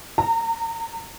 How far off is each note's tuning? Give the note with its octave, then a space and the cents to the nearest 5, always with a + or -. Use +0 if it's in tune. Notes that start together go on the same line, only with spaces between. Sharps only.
A#5 -30